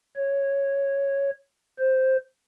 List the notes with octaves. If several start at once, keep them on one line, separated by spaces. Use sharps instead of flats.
C#5
C5